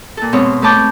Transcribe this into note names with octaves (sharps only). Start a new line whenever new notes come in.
A#2 A4
G#2 B2 C4 C#5
A3 B4 C#5 A5 D6 G6